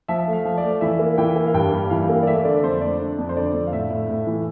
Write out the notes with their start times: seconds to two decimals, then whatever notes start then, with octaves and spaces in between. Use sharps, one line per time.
0.08 F3 E5
0.27 A3
0.33 F5
0.45 F3
0.58 D5
0.64 A3
0.81 E3 E5
0.99 A#3
1.18 E3 G5
1.36 A#3
1.46 F5
1.54 G2 G5
1.72 G3
1.90 E3 F5
2.09 A#3
2.23 D5
2.27 A3 E5
2.45 D3 D5
2.64 F2 C5
2.81 A3 D5
3.00 D4
3.18 F2
3.29 C5
3.36 D3 D5
3.54 F2
3.67 F5
3.72 A2 E5
3.91 A2
4.09 A2
4.27 E3